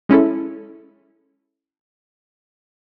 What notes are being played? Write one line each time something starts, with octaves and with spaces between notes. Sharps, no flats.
G#3 C#4 E4 A4